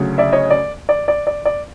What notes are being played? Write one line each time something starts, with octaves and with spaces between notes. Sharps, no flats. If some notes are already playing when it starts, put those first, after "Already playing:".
Already playing: D2 C#3 F#3
D5 E5
C#5 D#5
D5
D5
D5
D5
D5